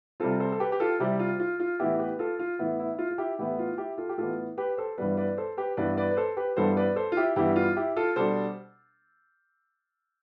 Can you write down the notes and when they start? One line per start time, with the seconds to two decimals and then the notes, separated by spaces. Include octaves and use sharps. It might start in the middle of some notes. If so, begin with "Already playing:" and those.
0.20 C3 G3 C4 F4 A4
0.40 A4 C5
0.52 A4
0.60 G4 B4
0.72 G4
0.80 F4 A4
1.00 C3 G3 C4 E4 G4
1.19 F4
1.40 F4
1.60 F4
1.79 A2 E3 B3 E4 G4
1.99 G4 B4
2.19 F4 A4
2.39 F4
2.59 A2 E3 B3 E4
2.79 E4
2.94 E4
2.99 F4
3.11 F4
3.18 E4 G4
3.39 A2 E3 B3 E4 G4
3.59 F4
3.78 E4 G4
3.98 F4 A4
4.09 G4
4.18 A2 E3 B3 F4 A4
4.58 G4 B4
4.77 A4 C5
4.98 G2 E3 G3 B3 B4 D5
5.17 B4 D5
5.37 A4 C5
5.57 G4 B4
5.77 G2 E3 G3 B3 B4 D5
5.97 B4 D5
6.11 B4
6.17 A4 C5
6.37 G4 B4
6.56 G2 E3 G3 B3 A4 C5
6.77 B4 D5
6.96 A4 C5
7.12 F4
7.17 E4 G4
7.36 G2 E3 G3 B3 E4 G4
7.56 F4
7.76 E4 G4
7.96 F4 A4
8.16 B2 G3 D4 A4 C5